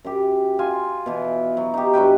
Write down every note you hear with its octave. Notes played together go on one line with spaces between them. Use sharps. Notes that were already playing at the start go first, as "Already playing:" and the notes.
F#2 G4
F4 G#5
B2 E3
F#3
D#4 G4
G2 F#3 B4 G5